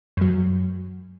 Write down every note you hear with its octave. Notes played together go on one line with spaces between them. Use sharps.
F#2 F#3